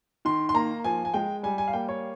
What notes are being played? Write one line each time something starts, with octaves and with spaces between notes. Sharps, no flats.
D#3 C6
C6
A#3 A#5
F3 G#5
G#5
G#3 G5
G3 G#5
G#5
F5
A#3 G5
C#5